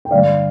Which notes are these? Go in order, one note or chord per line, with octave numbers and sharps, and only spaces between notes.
G5
G2 D3 D5 F5